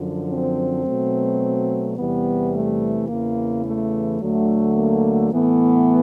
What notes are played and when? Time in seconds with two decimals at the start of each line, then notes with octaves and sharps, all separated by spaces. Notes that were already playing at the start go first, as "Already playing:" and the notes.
Already playing: F#2 D3 F3
0.29 C4
0.85 B2 F#3 A3
1.97 E2 C3 E3 G3 B3
2.53 A3
3.08 E2 C#3 E3 A#3
3.64 A3
4.20 D2 D3 F#3 A3
4.76 A#3
5.32 A2 E3 A3 B3